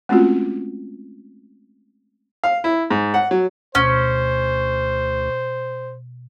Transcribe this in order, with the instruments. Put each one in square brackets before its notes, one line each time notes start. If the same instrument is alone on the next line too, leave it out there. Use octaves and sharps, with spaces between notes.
[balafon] G#3 A3 C4 C#4 F4 F#4
[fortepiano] F5
E4
G#2
F#5
F#3
[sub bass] D2 [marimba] B2 [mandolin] C#4 [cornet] C5